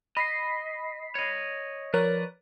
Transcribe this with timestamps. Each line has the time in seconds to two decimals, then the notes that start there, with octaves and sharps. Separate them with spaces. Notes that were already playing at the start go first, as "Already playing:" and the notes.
0.17 D#5 B5 B6 C7
1.15 C#5 D#5
1.94 F3 A#4 B4 C#5 D5